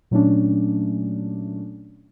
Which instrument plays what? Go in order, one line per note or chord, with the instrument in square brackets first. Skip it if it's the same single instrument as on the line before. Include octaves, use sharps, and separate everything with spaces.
[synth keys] A#2 F#3 A3 C#4 D4